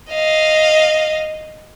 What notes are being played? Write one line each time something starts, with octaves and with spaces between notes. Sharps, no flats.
D#5 F5